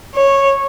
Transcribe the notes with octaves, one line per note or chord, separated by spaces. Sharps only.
C#5